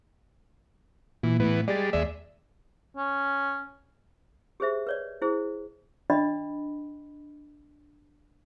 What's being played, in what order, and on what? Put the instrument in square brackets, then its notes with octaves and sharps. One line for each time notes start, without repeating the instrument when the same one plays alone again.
[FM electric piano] A#2 [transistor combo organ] E3
[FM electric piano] A2 [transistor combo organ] E3 B3
[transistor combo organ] G3 G#3 [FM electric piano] D5 A6
[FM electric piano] D#2 D5 [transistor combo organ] G#3 E5
[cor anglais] C#4
[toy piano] G4 G#4 C5 E5
B4 C#5 D5
E4 G#4 C5
D4 D#5 B5